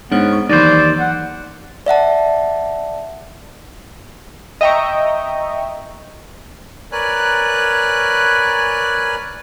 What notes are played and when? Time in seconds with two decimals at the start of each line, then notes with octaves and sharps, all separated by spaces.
0.12 G#2 B3 D4 C#5 F6
0.33 C#6
0.49 D#2 E3 F#3 D#4 C5 D5
0.99 F#5
1.86 D5 E5 F#5 A5
4.61 D#5 E5 G5 A#5 C#6
6.92 A#4 B4 C#5 D5 G#5 F#6